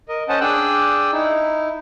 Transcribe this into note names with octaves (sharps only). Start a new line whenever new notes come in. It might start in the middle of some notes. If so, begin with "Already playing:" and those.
A#4 D#5
C#4 C5 D#5 F#5 A5
D4 G#4 G5 D#6 E6 F#6
D#4 E4